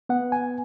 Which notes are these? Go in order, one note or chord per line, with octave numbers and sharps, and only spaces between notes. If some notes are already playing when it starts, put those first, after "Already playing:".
B3 F#5
G#5